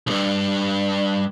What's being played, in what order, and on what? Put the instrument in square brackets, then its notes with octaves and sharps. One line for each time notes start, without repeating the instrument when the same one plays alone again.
[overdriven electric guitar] B1 G2